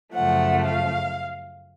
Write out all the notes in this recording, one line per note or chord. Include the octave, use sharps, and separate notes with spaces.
F#2 C#3 F3 A3 F#5
F5